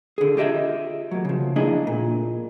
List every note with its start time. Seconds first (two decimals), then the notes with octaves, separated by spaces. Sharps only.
0.18 D3 G#4
0.37 F4 G4 D#5 E5
1.11 F#3 A#3
1.25 C#3 F3
1.56 A#3 D4 E4 G#4 D#5
1.87 A#2